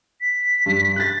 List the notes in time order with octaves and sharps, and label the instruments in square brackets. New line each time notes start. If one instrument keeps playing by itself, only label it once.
[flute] B6
[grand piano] G2
F#6 A6